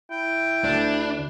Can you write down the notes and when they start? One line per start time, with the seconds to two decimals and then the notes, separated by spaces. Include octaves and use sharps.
0.11 E4 G5
0.64 D2 D4